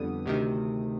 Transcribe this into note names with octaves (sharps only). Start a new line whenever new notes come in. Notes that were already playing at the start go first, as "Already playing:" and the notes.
Already playing: F2 D3 G3 B3 D#6
D2 C3 D#3